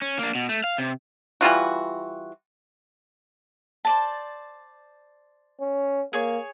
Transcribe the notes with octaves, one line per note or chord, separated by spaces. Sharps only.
C#4
A#3 D4
B2
A3
F5
C3
E3 G3 F4 F#4
C5 D5 A5
C#4
A#3 G#4 C#5